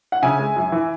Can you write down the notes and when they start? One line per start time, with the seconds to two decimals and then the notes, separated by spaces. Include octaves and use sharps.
0.12 F#5
0.22 C#3 E5 G#5
0.39 G#3
0.56 F#2
0.72 E3